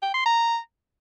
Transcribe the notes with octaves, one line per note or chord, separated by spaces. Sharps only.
G5
C6
A#5